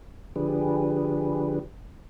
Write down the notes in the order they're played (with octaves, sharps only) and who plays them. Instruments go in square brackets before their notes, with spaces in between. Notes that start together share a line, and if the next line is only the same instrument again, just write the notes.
[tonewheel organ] D3 F3 D4 G4 G#4 B4